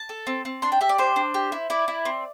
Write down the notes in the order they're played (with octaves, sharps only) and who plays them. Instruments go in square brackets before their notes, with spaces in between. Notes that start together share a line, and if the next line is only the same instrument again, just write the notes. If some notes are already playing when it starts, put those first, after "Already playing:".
Already playing: [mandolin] A5
A4
C4
C4
D4 C6
G5
G4 E5
D5
D4 C5
D4
G4
E4
E4 D5
E4
C4